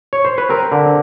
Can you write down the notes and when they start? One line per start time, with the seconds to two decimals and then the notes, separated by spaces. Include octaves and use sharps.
0.13 C#5
0.25 C5
0.38 B4
0.49 C4 A#4
0.72 D3